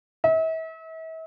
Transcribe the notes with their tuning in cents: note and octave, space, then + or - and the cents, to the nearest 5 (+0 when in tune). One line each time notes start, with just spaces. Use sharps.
E5 -40